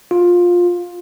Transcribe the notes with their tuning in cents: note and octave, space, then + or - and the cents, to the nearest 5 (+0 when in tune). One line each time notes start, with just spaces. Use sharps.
F4 +15